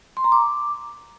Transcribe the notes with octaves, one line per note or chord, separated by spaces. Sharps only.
C6
A#5
D6